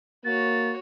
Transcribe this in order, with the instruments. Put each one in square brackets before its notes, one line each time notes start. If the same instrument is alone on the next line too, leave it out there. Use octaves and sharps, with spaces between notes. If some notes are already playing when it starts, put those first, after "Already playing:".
[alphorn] A#3 [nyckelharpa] F#4 C#5 [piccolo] A6